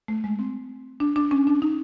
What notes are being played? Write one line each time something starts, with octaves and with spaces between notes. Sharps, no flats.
A3
G#3
C4
D4
D4
C#4
D4
D#4